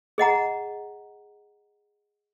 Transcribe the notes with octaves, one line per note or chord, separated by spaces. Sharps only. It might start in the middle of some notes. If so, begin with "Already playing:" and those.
G#4 D#5 F#5 A#5